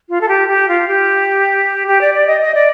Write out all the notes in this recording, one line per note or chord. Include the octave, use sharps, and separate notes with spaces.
F4
A4
G4
G4
F4
G4
G4
D5
D5
D#5
D#5
D5